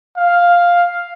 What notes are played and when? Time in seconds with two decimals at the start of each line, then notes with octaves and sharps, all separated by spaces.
0.17 F5